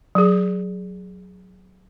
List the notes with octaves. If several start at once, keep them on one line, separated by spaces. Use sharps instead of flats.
F#3 G#4